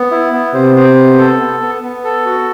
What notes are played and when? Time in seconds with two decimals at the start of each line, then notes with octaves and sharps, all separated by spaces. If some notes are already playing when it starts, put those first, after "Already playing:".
Already playing: B3
0.11 E4
0.33 B3
0.54 C3 C5
0.76 C5
0.97 B3
1.18 A4
1.39 B3
1.61 B3
1.83 B3
2.04 A4
2.26 F#4